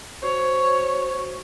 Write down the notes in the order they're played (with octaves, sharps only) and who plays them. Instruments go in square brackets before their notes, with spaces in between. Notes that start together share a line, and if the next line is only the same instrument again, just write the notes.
[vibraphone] F#4 C5 [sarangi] C#5